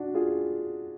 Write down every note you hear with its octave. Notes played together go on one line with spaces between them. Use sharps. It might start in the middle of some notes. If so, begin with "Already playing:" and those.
Already playing: D4 F#4
F4 G#4